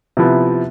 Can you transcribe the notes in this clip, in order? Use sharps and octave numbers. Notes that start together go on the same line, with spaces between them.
C3 F3 B3 E4